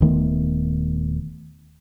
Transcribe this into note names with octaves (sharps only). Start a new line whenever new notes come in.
D#1 D#3 A3 B3